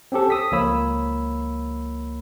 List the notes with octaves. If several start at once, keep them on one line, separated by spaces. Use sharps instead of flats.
C4 C#4 G4 A4
D#6 E6 B6
C#2 F3 A#3 C#5 B5 E6